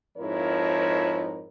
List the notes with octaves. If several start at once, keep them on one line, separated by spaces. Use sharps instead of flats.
F2 G#2 F3 E4 A#4 C#5